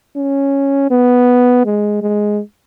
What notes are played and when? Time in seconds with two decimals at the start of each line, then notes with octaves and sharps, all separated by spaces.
0.17 C#4
0.90 B3
1.65 G#3
2.02 G#3